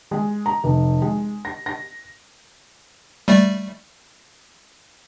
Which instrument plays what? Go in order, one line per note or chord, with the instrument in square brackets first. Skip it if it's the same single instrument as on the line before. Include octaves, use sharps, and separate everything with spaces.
[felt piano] G#3
A#5
F1
G#3
A#6
A#6
[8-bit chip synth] G3 A3 D5